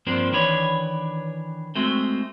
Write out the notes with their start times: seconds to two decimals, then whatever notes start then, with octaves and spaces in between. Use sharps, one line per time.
0.06 G2 F3 A#3 C4 D4
0.32 D#3 E3 D4 B4 C#5
1.75 G#3 A3 C4 F#4